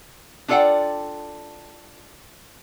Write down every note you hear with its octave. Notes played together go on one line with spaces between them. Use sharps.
D4 F4 A4 D5 F#5 G5